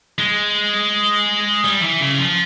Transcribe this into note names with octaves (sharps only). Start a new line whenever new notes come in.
G#3
G3
E3
C#3
F3